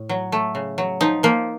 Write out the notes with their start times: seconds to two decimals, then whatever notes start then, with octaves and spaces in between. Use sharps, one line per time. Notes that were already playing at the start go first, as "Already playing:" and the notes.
Already playing: A2
0.09 F#3
0.32 A3
0.55 C#3
0.78 F#3
1.01 F3 D#4
1.23 F3 A#3